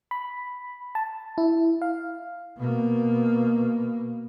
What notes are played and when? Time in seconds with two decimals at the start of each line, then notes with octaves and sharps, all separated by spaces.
0.11 B5
0.95 A5
1.38 E4
1.82 F5
2.58 B2 A#3